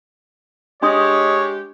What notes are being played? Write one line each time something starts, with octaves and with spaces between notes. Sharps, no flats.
G#3 D4 G4 C#5 D#5 C6 D#6